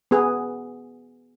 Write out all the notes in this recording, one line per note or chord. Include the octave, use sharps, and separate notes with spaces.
B3 G#4